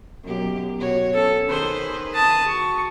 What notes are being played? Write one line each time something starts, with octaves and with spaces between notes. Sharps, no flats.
F#2 B2 G4
B2 F#4 C#5
C#4 A4
D#3 G#4 B4 C5
A5 D#6
F#4 C#6